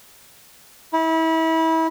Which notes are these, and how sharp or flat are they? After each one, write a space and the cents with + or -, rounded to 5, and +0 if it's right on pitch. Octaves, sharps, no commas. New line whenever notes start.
E4 -30